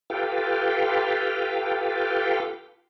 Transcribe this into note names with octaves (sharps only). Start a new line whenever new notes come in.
F4 G4 A4 B4 F5 G5